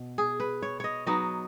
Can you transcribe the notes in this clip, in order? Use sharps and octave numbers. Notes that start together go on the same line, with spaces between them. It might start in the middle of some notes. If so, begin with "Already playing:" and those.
Already playing: B2
G#4
B4
C#5
C#5 D#5
F#3 B3 D#4 D#5